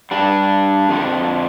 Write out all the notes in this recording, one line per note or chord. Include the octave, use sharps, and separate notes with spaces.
G2 G3 D4
F2 D3 F3